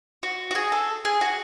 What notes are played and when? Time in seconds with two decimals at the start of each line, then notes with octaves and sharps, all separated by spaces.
0.23 F#4
0.51 F#4
0.55 G#4
0.72 A4
1.05 G#4
1.21 F#4